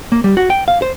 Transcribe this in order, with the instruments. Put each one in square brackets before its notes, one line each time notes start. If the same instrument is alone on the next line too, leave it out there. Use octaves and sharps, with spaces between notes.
[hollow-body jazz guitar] A#3
G3
F#4
G5
F5
C5